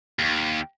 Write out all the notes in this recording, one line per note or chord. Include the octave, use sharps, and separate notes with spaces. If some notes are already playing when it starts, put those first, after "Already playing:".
D#2